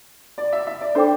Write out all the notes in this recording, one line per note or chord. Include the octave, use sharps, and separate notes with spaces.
D5
E5
E5
D5
D4 A4 C5 D5 G5 D6